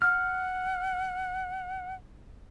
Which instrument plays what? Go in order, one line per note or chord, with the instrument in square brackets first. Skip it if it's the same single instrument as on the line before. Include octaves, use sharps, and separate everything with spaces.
[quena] F#5 [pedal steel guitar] F6